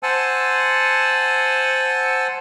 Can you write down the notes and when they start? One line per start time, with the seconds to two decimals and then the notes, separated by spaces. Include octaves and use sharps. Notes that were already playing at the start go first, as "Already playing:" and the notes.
0.03 C5 F#5 G#5 A5 E6